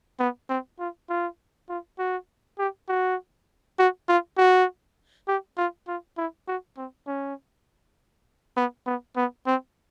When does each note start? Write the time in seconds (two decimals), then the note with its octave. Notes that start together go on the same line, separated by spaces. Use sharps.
0.19 B3
0.49 C4
0.79 F4
1.09 F4
1.69 F4
1.99 F#4
2.59 G4
2.89 F#4
3.79 F#4
4.09 F4
4.38 F#4
5.28 G4
5.57 F4
5.88 F4
6.17 E4
6.47 F#4
6.77 C4
7.07 C#4
8.57 B3
8.86 B3
9.17 B3
9.47 C4